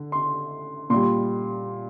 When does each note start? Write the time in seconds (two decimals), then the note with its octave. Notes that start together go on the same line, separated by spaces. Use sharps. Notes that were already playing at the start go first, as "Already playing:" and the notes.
Already playing: D3
0.12 C6
0.90 A#2 G3 C6